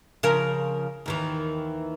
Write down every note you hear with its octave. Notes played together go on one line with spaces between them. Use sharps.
C#3 F3 A#4
D#2 D#3 E3